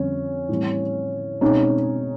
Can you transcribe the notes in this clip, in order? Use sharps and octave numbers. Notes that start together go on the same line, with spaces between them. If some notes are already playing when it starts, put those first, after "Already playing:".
Already playing: F2 D3 G3 C4 C#4
A2 E3 G3 C4
B2 G#3 C4 C#4 D#4